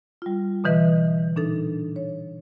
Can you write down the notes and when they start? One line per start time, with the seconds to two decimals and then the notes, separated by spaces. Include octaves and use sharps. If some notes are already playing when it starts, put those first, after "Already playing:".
0.22 G3 F4
0.64 B2 D3 E3 B4 D#5 E5
1.36 A#2 D4 D#4 A4
1.96 C#5